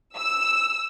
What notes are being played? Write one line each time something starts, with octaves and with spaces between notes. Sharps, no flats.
E6